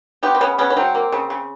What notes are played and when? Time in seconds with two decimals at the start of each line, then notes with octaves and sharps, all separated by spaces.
0.23 B3 F4 G4
0.35 C4
0.40 C#3 B3 C#4
0.58 C#3 B3 C#4
0.70 C#4
0.77 F#3 C4
0.95 A#3
1.12 C#3
1.30 C#3